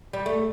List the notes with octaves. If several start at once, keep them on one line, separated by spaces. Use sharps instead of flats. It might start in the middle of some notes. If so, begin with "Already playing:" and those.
G3
A3